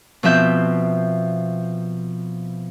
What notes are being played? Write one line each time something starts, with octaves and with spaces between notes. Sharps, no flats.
B2 F3 C4 E5 G6